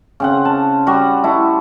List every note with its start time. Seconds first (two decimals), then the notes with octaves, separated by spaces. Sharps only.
0.20 C#3 C4 F#5
0.45 A5
0.87 G3 F#4 F#5
1.24 E4 A5 C#6